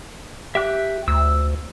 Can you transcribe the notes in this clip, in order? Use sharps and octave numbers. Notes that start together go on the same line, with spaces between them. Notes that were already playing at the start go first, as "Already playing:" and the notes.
G4 E5 G5 F#6
D2 E6